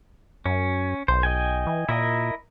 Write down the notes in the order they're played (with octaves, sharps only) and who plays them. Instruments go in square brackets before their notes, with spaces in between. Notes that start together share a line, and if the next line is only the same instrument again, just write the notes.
[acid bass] F#2 [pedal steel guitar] C#4
[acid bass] B1 [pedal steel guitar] C5
[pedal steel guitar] D#5 G5 G#5
[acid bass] E3
[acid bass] A#2 [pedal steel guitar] E4 A#4 D#5